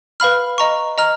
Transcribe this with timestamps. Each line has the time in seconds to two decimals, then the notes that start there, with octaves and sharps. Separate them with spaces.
0.20 B4 F5 B5 F6
0.58 D#5 A#5 C#6
0.98 D#5 A#5 F6